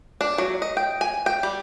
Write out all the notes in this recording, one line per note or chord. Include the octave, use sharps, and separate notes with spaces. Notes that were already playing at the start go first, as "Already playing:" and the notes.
D4
F#3
D#5
G5
G#5
G5
G3